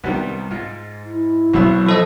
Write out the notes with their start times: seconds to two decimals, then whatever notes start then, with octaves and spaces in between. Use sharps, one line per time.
0.04 C2 D#3 G3 B3
0.51 G#2 F4
1.05 E4
1.54 G#1 D2 B2 F#3 B3 E6
1.86 F3 A4 D#5